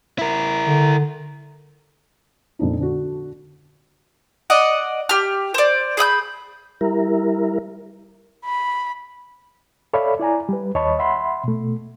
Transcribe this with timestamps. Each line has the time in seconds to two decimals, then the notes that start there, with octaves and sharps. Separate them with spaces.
0.19 E4 A#4
0.66 D3
2.59 F2 A#2 D4 D#4
2.78 D3 D4 F#4
4.50 D5 D#5 F#5
5.09 G4 F6
5.54 C5 D5
5.97 G#4 B5 D#6 G6
6.81 G3 E4 A#4
8.45 B5
9.93 A4 C#5 D5 E5 F5 B5
10.19 E4 D5 G#5 A#5
10.49 G3 B4
10.75 D#2 C#5 D#5 A5 B5 C#6
10.99 E5 F#5 B5 C6
11.44 B2 A3